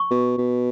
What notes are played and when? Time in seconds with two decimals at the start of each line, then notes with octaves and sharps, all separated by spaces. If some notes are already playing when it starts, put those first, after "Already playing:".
Already playing: C#6
0.10 B2
0.37 B2